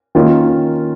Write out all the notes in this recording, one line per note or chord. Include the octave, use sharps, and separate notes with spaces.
D#3 A#3 C#4 F4